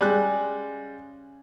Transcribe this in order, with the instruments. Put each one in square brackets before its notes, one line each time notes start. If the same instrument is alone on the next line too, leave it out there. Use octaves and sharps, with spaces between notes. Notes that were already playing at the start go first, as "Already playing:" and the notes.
[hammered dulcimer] C#3 G#4 [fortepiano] G3 G#3 F#6